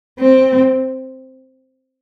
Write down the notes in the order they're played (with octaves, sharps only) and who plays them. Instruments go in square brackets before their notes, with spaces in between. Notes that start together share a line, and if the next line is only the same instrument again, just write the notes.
[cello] C4